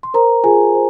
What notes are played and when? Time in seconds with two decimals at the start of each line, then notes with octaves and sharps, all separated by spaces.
0.03 C6
0.14 A#4 C5 A#5
0.44 F4 G#4 G#5
0.75 C5